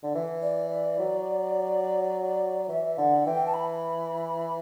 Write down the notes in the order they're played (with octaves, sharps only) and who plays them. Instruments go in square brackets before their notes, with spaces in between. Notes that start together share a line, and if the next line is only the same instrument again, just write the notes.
[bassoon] D3
E3
[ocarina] D5
D5
[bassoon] F#3
[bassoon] E3 [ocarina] E5
[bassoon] D3 [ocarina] F#5
[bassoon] E3 [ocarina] G5
[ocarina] A5
B5